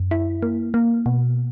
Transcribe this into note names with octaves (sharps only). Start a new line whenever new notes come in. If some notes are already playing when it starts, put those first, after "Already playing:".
Already playing: F#2
E4
A#3
A#3
B2